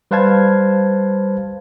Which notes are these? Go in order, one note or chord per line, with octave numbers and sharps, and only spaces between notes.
G3 B4 C5 F5 A5 G#6